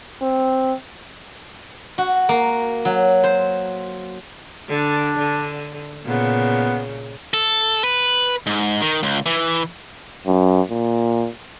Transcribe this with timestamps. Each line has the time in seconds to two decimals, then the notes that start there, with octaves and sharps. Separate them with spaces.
0.21 C4
1.98 F#4
2.29 A#3
2.85 F#3
3.24 C5
4.69 D3 D4
5.18 D3
6.05 A#2 C#3 B3
7.34 A4
7.84 B4
8.47 G#2
8.81 D#3
9.03 C#2
9.26 E3
10.26 F#2
10.70 A#2